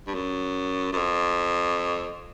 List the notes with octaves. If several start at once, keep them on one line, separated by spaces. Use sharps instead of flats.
G2
F#2
F#2
F2